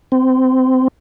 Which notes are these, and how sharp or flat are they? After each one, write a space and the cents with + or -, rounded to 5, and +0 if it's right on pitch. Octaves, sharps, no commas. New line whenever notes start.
C4 -20